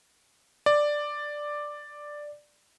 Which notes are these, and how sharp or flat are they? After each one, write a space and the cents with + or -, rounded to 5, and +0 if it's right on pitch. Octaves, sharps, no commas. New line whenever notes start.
D5 +5